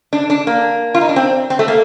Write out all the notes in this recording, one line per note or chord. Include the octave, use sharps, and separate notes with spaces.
D4
D4
A#3
F4
D#4
D4
C4
C4
A3
A#3